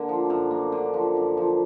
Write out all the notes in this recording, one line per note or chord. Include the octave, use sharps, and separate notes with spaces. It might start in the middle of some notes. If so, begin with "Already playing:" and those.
Already playing: D3 A#3
F3
F#2
A#3
D3
F3
F#2
F3